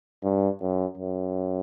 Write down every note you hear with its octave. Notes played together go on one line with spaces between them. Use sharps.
G2
F#2
F#2